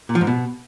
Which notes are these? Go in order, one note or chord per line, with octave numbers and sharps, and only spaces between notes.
A#2
F3
G#2
B2